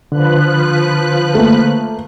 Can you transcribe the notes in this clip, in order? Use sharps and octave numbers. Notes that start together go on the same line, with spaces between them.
D3 F3 B4 F#6
A3 A#3